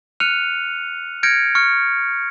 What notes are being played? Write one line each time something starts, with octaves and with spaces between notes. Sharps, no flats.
F6 F#6 C#7 D#7 F7
F6 G6 G#6 A#6 C#7 D7
C#6 F6 C#7